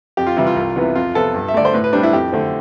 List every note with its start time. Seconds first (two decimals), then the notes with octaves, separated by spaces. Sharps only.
0.17 F2 G4
0.27 F4
0.37 C3 E3 G3 E4
0.47 F4
0.56 C2
0.76 C3 E3 B3
0.95 F2 F4
1.15 C3 F3 B3 A4
1.34 G2
1.48 E5
1.54 D3 A3 D5
1.65 C5
1.73 A2 B4
1.84 B4
1.93 G3 C4 D4
2.03 E4
2.13 F2 G4
2.33 D3 A3 C4